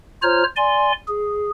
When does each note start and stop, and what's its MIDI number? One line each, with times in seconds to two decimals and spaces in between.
0.22 0.43 65
0.22 0.43 72
0.22 0.43 73
0.22 0.43 82
0.22 0.43 89
0.56 0.92 74
0.56 0.92 80
0.56 0.92 84
1.08 1.50 68